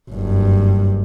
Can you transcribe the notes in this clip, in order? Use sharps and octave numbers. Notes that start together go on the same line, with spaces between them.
F#1 G2